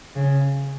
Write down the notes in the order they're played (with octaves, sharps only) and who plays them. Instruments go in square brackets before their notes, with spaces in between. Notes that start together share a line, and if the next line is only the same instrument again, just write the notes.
[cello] C#3